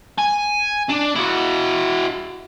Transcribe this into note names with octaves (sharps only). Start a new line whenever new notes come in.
G#5
D4
E4 F#4